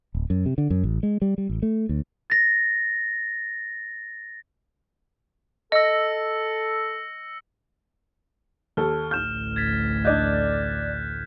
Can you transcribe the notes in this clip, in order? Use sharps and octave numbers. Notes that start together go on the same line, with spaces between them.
D1
F#2
C3
D3
F#2
A1
G#3
G3
G3
A1
A3
D2
A6 A#6
A4 D#5 E6 A#6 C#7
D#2 A4 F6
A1 D2 F6 G6 E7
G#6 A6 B6
D4 D5 D#5 F#6 G6